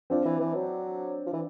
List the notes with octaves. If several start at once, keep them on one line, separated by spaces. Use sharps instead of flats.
F3 C4 D4
E3
E3
F#3
F3
E3